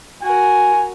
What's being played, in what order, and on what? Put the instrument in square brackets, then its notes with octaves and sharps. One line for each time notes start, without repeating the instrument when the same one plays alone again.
[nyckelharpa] F#4 A#4 [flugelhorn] G#5